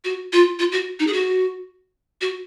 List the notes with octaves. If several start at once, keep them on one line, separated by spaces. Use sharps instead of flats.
F#4
F4
F4
F#4
D#4
G#4
F#4
F#4